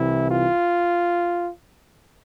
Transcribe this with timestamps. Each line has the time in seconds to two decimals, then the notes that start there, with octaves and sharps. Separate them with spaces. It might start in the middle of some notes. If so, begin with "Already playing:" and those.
Already playing: C2 C3 E3 E4
0.30 F4